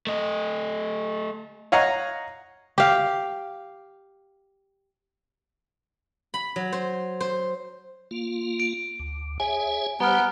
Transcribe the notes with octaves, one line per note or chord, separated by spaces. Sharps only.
A3 D#5
C#5 D#5 F5 F#5 A#5
G4 F5
B5
F#3
C5
C5
A#3 F4
D7
D2
G#4 C#5 E5 G#5
G3 B3 G4 C5 A#5 F6